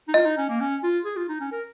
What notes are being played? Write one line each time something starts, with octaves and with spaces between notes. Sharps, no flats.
D#4
F4 D#5
D#4
C#4
A#3
C#4
F4
G#4
F4
D#4
C#4
A#4